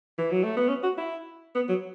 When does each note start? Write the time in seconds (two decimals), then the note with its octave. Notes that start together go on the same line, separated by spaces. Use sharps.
0.18 E3
0.31 F#3
0.43 A3
0.56 B3
0.68 C#4
0.83 F#4
0.98 E4
1.55 B3
1.68 F#3